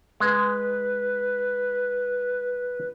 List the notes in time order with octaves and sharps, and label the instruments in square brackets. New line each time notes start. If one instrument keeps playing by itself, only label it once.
[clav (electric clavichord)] G#3 [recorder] B4